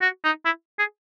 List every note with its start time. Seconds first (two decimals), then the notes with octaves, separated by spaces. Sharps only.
0.01 F#4
0.24 D#4
0.45 E4
0.79 G#4